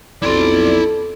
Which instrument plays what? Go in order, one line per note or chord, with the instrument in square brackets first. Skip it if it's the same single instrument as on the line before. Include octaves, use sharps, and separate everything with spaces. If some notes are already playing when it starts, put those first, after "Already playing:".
[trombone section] B1 F2 [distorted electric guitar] E4 C6 [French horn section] A4 [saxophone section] D5